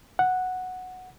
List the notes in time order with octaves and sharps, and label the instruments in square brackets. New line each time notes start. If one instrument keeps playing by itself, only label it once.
[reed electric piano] F#5